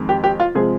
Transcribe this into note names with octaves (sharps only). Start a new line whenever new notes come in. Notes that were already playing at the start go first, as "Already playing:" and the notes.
Already playing: F2 D#3 G#3
G4
G4
F4
C3 F3 G#3 G#4